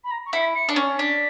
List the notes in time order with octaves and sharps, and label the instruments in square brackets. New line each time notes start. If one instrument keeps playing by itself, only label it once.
[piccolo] B5
A#5
C#6
[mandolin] E4 [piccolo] C#7
[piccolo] B6
C#7
[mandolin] D4
C#4
[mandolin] D4 [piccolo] B6